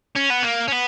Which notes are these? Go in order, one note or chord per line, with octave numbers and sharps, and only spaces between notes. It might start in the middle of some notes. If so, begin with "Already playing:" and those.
C#4
B3
A#3
C#4
B3